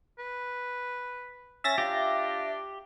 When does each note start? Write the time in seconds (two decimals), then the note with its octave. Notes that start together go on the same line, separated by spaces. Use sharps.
0.19 B4
1.64 C#4 E5 A6 A#6
1.78 D4 F4 G4